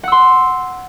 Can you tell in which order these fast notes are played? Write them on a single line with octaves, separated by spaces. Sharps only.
F#5 E6 C6